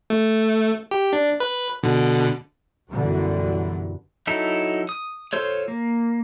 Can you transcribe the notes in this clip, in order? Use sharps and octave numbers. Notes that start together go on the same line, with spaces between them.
A3
G4
D4
B4
B2 D3
B1 F#2 D3 E3 G3
F#3 D#4 E4 A4
D#6
F4 A4 C5 C#5
A#3